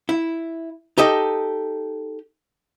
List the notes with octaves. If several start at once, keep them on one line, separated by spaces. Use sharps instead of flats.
E4
D#4 G4 A4 D#5